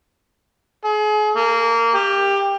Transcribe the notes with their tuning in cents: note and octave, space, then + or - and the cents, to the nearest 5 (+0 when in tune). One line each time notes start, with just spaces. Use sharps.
G#4 +35
A#3 -20
G4 +15